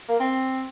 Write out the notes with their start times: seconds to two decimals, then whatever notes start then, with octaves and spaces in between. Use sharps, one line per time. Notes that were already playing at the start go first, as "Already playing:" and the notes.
0.09 A#3
0.20 C4